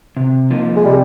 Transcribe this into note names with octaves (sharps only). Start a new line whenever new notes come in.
C3
F3 A#3 D#4
G#3
C3 G3